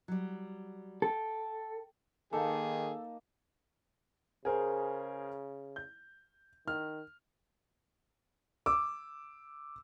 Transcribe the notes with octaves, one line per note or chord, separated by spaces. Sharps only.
F#3 G3
A4 G5
D#3 A#3 D#4 G#4 A4 A5
C#3 G#4 A#4 C5
G6
D#3 F6
D6 E6